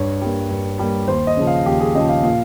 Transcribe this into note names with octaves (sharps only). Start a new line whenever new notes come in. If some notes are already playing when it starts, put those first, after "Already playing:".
Already playing: G2 C#5
G3 A#3
G2
G3 A#3
D#2 C5
D#5
C#3 F3
F5
D#2 G4
G#4
C#3 F3 D#5
F5
A#2 F5